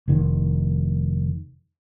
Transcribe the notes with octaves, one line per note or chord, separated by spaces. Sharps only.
F1 D#3